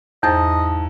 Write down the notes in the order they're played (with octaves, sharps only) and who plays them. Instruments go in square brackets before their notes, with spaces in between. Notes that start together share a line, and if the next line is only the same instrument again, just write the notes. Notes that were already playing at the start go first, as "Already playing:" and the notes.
[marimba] E2 C5 A6 [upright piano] G#2 E4 [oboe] D#5 [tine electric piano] A5